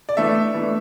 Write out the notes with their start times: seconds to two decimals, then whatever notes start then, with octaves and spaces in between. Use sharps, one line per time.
0.09 D5
0.17 E3 A3 D4 E5
0.54 E3 A3 D4